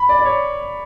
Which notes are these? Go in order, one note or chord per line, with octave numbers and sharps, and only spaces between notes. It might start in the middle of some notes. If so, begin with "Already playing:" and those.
Already playing: B5
D5
D5
C#5